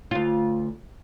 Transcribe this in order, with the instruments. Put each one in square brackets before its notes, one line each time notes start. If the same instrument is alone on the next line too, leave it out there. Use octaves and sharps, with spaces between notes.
[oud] D2 F4